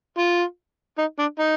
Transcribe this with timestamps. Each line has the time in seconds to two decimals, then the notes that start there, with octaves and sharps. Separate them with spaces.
0.18 F4
0.98 D#4
1.19 D4
1.39 D#4